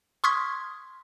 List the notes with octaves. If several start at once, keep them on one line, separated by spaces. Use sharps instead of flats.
C6 C#6 D#6 F6 G#6 B6